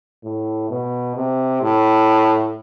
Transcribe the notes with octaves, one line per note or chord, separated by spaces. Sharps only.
A2
B2
C3
A2